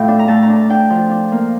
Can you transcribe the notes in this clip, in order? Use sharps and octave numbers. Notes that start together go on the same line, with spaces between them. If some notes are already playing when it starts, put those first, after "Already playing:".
Already playing: A2 A3 F4 F5 G5
D4
A#5
A3 A5
A#5
D4
A5
D4 G5
F3
D4
A#3